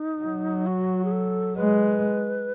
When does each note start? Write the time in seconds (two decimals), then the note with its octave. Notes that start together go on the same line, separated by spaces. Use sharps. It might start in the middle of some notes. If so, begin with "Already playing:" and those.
Already playing: D#4
0.22 F#3
0.67 F#4
1.05 G#4
1.11 A4
1.57 G#3 B4